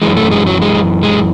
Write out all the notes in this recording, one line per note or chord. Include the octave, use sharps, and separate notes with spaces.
F#2 E3 G#3
A3
G#3
F#3
G#3
G#3